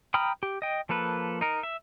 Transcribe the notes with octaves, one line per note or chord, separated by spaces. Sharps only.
G5 A#5 B5 D#6 F6
G4
D#5 G5
F3 A#3 A4 B4
D#4 A#4
E5